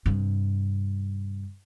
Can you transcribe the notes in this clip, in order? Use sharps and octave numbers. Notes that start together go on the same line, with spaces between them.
G2 C3